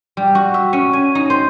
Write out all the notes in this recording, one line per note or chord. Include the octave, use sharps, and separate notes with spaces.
G3
F#4
E5
C#4
G#5
D#4
C5